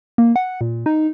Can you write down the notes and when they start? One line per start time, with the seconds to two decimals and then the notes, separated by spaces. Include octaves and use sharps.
0.18 A#3
0.36 F#5
0.61 A#2
0.86 D#4